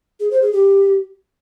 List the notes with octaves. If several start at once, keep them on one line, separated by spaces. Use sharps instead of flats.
G#4
C5
G#4
G4